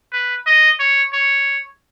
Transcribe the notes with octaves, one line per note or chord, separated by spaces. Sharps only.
B4
D#5
C#5
C#5